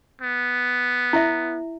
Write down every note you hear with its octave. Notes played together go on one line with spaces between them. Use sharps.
B3
E4 E5